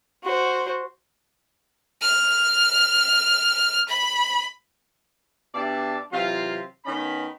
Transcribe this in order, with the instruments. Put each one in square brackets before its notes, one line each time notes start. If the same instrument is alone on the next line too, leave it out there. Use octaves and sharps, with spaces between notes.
[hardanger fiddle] F#4 C5
[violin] F6
B5
[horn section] B2 D4 G4 D5 E5 A5
C3 E3 F#3 F4
D#3 B3 C#4 D#5 B5